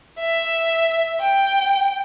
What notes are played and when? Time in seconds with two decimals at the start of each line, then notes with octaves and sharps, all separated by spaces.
0.19 E5
1.21 G5